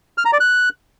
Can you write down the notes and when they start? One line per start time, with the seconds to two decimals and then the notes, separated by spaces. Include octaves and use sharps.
0.18 F6
0.25 A#5
0.33 D5
0.40 F#6